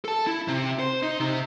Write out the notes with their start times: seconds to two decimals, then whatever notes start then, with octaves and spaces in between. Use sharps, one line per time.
0.05 A4 A5
0.27 E4
0.48 C3
0.79 C5
1.03 D#4
1.20 C3